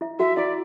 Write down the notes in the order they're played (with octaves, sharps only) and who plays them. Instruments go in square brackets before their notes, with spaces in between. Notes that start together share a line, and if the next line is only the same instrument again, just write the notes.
[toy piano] E4 E5
[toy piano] F#4 F#5 [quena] E5
[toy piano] E4 E5 [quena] D5